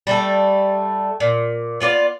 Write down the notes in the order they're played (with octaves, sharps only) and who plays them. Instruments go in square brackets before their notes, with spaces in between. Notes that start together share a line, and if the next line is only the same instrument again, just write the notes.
[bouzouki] G3 A3 A4
A#2
B3 F4 D5